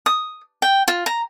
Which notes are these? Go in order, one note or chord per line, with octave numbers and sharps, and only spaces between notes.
D#6
G5
F4
A#5